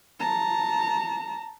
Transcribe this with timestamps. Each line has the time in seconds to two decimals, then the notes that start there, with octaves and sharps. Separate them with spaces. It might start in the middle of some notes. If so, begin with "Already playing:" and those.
0.20 A5 A#5